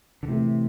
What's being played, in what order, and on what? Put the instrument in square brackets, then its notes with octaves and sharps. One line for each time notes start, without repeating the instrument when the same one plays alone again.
[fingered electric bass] D3
[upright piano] A2 E3 A3 [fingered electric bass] C3